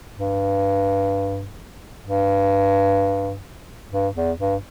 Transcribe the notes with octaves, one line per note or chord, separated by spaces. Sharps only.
G2
G2
G2
E2
G2